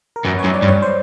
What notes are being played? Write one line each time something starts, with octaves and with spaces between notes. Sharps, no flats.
A#4
F#2 B4
C#5
F#2
D5
G2
C#5
C5